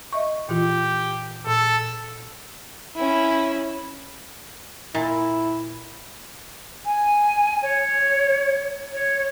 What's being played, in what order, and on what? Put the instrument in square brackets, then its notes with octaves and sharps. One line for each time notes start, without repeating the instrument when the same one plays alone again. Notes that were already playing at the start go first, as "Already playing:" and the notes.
[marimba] D#5 E5 C#6
[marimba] A#2 E3 F4 [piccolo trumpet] G4
[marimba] A#2 [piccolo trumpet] A4
[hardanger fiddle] C#4 E4
[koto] A#2 [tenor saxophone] E4
[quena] G#5
C#5
C#5